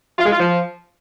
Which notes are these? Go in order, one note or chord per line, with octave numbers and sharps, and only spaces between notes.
F4
G#3
F4
F3